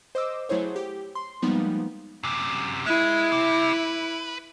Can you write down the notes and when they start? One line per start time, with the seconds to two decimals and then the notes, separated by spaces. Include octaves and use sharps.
0.15 C5 D#5 D6 E6
0.49 F#3 A3 E4 G#4 C5 C#5
0.76 G4
1.15 C6
1.42 F3 G3 G#3 A#3 B3 D#4
2.23 F#2 C3
2.86 G#3 E4
3.32 C3 C4
3.73 B4